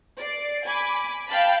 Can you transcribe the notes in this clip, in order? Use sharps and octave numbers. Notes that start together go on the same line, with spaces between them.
D5 C7
G#5 B5 D6
F5 G5 A5 B5